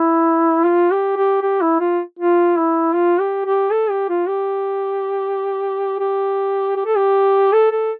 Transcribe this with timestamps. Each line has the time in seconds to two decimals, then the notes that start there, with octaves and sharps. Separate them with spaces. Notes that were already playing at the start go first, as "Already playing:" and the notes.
Already playing: E4
0.66 F4
0.91 G4
1.17 G4
1.42 G4
1.62 E4
1.80 F4
2.19 F4
2.57 E4
2.95 F4
3.20 G4
3.46 G4
3.71 A4
3.90 G4
4.09 F4
4.28 G4
6.00 G4
6.76 G4
6.86 A4
6.96 G4
7.53 A4
7.72 A4